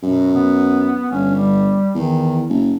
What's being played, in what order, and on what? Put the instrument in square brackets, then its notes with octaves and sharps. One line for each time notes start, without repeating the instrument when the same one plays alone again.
[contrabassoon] F#2 [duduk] B2
[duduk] B3
[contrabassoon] G1 [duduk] C#4
[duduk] G3
[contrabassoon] E2 [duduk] D#3
[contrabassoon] F#1